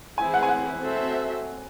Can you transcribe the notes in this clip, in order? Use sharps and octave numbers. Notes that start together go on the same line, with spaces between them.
E3 C4 E4 G#4 C5 G#5
F#5
G#5
F#5
C4 F#4 A4 C5 E5